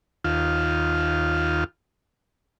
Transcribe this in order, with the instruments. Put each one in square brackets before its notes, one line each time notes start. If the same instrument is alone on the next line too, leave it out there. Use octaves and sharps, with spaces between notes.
[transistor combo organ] D#2 F4